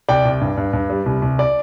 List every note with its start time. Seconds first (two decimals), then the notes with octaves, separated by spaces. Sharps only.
0.09 C2 D5 G5
0.25 C2
0.41 G2
0.57 G2
0.73 G2
0.90 G3
1.06 C2
1.22 C2
1.39 D5